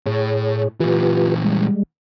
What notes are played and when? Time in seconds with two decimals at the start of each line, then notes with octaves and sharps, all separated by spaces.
0.06 A2 G#4 C#5
0.80 A#2 E3 F4 G4 B4
1.44 G3 G#3